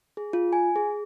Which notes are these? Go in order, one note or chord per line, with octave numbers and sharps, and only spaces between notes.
G#4
F4
G#5
G#4